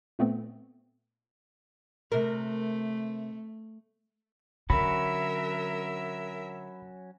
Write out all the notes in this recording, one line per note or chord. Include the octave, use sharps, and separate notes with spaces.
A#2 A3 B3 C4
C3 A3 A#4
D3 F#3 C#4 F#4 A#4 E5 B5